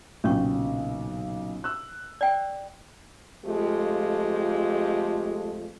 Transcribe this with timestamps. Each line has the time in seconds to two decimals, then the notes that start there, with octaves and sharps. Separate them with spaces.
0.24 B1 A#2 C#3 C#4 D4 C#6
1.64 E6 F#6
2.21 D5 G5
3.45 F2 G#3 A3 F4 G4